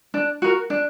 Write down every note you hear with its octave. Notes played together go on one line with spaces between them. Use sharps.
D4
F#4 A#4
D4